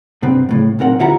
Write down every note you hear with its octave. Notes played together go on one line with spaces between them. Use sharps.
G2 C3 B3 C4
F2 A2 C#3
B1 A#2 C4 A#4 F#5
D2 E4 F4 G4 F#5 A#5